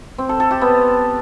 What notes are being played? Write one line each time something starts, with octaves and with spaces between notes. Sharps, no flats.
C4
A4
A4
G4
B3